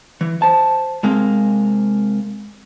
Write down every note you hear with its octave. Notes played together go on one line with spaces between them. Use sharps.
E3
C5 A5
C3 G#3 A#3 C4